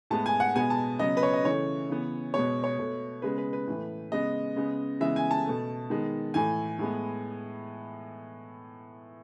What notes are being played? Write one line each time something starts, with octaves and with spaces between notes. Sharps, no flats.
A2 G#3 B3 A5
G#5
F#5
B2 G#3 B3 G#5
A5
C#3 F#3 B3 D#5
B4
C#5
D#5
C#3 E3 A3 C#5
C#3 E3 B3
B2 G#3 B3 C#5
C#5
B2 A3
C#3 G#3 B3 B4
B4
B4
A2 E3 A3
C#3 G#3 B3 D#5
C#3 G#3 B3
C#3 E3 G#3 B3 E5
G#5
A5
B2 A3
D#3 G#3 B3
A2 E3 A3 G#5
A2 G#3 B3